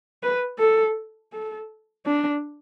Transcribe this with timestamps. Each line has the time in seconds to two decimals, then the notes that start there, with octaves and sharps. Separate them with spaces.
0.23 B4
0.59 A4
1.33 A4
2.06 D4